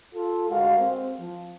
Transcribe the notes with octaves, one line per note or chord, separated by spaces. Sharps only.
F4 A4
D2 G#3 F#4 A#4 F5
C4
F3